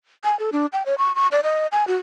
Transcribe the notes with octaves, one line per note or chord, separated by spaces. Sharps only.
G#5
A4
D4
G5
C#5
C#6
C#6
D5
D#5
G#5
F#4